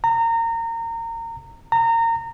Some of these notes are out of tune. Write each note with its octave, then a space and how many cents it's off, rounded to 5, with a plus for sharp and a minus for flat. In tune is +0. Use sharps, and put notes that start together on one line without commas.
A#5 -25
A#5 -25